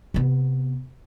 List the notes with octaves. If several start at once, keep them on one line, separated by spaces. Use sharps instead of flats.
C3 B3